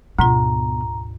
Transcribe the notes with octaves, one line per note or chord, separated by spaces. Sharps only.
D2 G#2 B2 F4 A#5